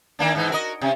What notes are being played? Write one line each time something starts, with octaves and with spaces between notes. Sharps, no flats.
D#3 A#3 D4
G#2 E3 D#4
F#4 A#4 D#5
C3 C#4